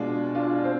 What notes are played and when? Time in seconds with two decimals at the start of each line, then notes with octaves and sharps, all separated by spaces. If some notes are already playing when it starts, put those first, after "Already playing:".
Already playing: B2 G#3 D4 F4
0.35 D4 F4
0.64 C4